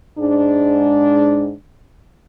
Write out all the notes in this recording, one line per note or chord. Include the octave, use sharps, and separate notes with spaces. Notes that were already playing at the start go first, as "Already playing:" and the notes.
G#2 D4